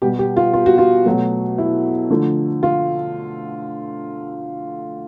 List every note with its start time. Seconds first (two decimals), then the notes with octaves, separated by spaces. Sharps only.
0.02 B2 G3 G4
0.19 G4
0.37 F4
0.53 F4
0.66 F#4
0.78 F4
1.06 B2 F#3 A3
1.58 E4
2.10 D3 F3 A3
2.63 F4